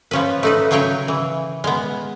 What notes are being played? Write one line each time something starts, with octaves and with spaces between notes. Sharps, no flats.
F3 C#4 B4
A3 D#4 B4
C#3 F#3 G#4 C#5 G5
E3
G#3 B3